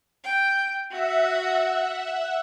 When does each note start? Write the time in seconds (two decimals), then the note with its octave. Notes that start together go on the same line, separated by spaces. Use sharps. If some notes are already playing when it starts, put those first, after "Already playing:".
0.24 G5
0.91 F#4 E5 F#5